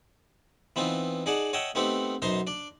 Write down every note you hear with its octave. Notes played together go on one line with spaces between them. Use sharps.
E3 B3 C4 D#4 F4
D#4 G#4 D5 F#5 A5
C#5 D#5 E5 F#5 G5 A5
A3 B3 C4 D#4 G4 F#5
F#2 B2 D#4 C5 A#5 C6
D4 D5